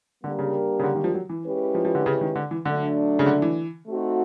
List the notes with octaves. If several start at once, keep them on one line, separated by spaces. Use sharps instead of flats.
D3 G3 A#3 D4 G4 A#4
C#3
C#3
D3
D#3
F3
F#3
E3
G#3 C#4 E4 G4 B4
F3
F3
D3
C#3
D#3
D3
E3
D3 F#3 A3 D4
C#3
D3
E3
A3 C4 D#4 F#4